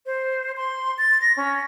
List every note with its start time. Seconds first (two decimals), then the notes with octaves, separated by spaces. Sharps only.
0.06 C5
0.57 C6
0.98 A6
1.22 A#6
1.37 C#4